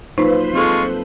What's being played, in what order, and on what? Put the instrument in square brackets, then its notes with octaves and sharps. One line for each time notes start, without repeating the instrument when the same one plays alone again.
[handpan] F#3 A#3 F4 [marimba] D#4 [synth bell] B4 C5
[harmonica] G#3 F4 C#6 [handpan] C4 A4